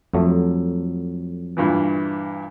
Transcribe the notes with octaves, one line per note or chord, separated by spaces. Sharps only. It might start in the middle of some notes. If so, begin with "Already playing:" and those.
F2 F#3 A3
G2 A#2 E3